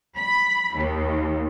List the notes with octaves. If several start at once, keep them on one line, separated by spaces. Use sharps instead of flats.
B5
D#2